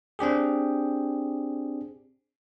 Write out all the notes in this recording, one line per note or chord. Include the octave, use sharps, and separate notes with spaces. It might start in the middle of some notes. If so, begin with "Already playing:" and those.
C4 D4 G4 G#4